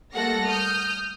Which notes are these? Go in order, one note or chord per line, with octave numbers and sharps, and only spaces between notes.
G3 A3 A#3 A4 F#5 A#6
D#6 F6 G6